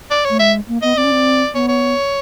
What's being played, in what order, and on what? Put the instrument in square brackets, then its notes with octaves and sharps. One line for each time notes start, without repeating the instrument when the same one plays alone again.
[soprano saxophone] D5
[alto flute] A3 [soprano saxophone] C#5
[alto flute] G#3 [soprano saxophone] E5
[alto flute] A#3
[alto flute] B3 [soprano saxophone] D#5
[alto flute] C4 [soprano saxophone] D5
[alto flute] C#4
C4
[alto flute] B3 [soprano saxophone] C#5
[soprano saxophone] C#5